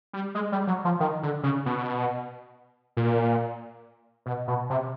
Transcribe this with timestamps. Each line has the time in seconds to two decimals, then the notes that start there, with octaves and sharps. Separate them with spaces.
0.13 G3
0.35 G#3
0.52 G3
0.67 F#3
0.85 F3
1.00 D#3
1.23 D3
1.43 C#3
1.66 B2
2.97 A#2
4.26 B2
4.48 B2
4.70 C3